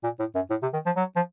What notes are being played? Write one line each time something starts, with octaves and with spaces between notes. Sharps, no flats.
A#2
A2
F#2
A2
C3
D#3
F3
F#3
F3